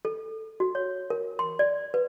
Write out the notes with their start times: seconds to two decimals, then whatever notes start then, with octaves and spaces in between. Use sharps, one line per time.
0.05 A4
0.60 F#4
0.75 C#5
1.10 A#4
1.39 C6
1.59 D5
1.94 B4